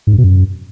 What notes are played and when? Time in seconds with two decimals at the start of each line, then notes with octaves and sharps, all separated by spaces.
0.07 G#2
0.13 G2
0.18 B2
0.24 F#2